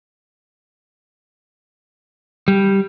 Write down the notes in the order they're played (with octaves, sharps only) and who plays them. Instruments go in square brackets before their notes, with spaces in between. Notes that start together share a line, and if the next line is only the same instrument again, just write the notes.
[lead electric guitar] G3